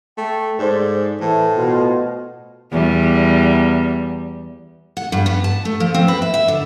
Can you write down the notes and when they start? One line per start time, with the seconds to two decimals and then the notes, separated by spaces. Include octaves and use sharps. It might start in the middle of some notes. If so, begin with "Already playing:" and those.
0.18 A3 G5
0.59 G#2 A4 C5 D5
1.21 A2 E3 A5
1.57 B2 F4
2.72 E2 G3
4.97 F#5
5.12 G2
5.26 B3
5.44 A5
5.65 A3
5.80 F3
5.94 C4
6.08 B4
6.22 E5
6.34 E5
6.48 D3